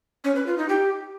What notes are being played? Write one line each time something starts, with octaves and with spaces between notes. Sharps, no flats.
C#4
B4
F4
D#4
G4